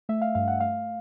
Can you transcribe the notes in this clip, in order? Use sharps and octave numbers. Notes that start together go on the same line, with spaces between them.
A3 E5
F5
G2 F5
F#5
A3 F5